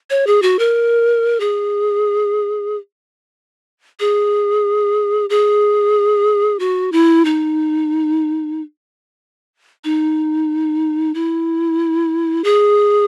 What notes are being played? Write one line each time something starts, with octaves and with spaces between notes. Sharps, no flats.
C#5
G#4
F#4
A#4
G#4
G#4
G#4
F#4
E4
D#4
D#4
E4
G#4